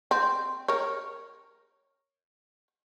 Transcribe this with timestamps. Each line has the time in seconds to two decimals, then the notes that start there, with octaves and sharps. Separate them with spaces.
0.11 C4
0.68 A#4 C#5